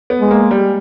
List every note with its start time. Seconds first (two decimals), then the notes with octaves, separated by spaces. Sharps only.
0.10 B3
0.20 G#3
0.31 A#3
0.51 G3